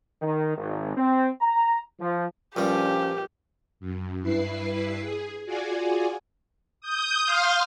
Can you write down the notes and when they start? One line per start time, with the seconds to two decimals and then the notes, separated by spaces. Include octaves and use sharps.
0.22 D#3
0.57 G#1
0.96 C4
1.41 A#5
2.00 F3
2.56 A#1 G2 F3 G3 C#4 G4
3.80 F#2
4.22 G2 E4 B4 C7
5.01 G#4
5.46 F4 F#4 G#4 D5 G#5
6.81 D#6 G6
7.25 F5 C6 F6